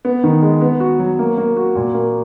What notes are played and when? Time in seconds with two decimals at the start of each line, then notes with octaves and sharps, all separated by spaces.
0.05 B3
0.24 D#3
0.42 G#3
0.61 B3
0.80 F#4
0.99 F#3
1.19 A#3
1.38 A#3
1.57 F#4
1.75 A#2
1.94 A#3